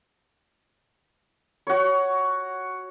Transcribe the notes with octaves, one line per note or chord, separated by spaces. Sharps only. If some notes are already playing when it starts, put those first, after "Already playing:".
F#4 C#5